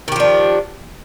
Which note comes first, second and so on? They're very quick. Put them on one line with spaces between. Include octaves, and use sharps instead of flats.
D#3 G4 F3 D4